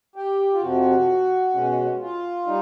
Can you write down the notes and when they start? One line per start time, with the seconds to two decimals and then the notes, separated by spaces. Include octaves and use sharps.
0.16 G4
0.54 F4
0.61 F2 C3 F3 F#4
1.54 B2 G#3 C#4
2.01 F4
2.46 G3 D#4